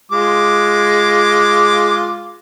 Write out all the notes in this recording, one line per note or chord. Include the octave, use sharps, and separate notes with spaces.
G#3 F4 D6